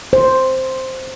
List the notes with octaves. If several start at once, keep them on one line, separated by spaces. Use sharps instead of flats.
C5